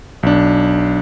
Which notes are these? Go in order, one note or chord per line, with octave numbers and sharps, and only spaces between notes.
B1 D4